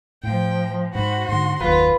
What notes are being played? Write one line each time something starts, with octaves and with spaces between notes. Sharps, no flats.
A2 F3 G5
G#2 F#4 C5 B5
G#2 D3 C6
F#1 D#2 F4 B4